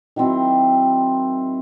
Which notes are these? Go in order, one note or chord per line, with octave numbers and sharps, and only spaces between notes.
D#3 F#3 C4 E4